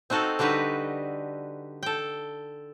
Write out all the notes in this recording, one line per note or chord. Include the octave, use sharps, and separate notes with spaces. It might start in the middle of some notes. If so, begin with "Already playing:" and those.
C4 D#4 F#4 A4 F5
D3 G3 D#4 F#4 B4
A4 G5